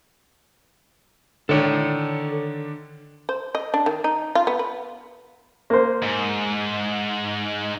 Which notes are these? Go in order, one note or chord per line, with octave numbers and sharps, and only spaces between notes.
D3 D#3 D4 A4 C#5
C5
D#5
D4
D#3
D#4
F4
B3
B4
A#3 C5
G#2